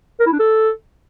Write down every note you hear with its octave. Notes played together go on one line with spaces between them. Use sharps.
A#4
E4
D4
A4